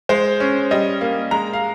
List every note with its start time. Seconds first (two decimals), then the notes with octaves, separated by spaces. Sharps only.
0.09 G#3 C5
0.40 C#4
0.71 G3 D#5
1.01 A#3
1.31 G#3 A#5
1.53 F5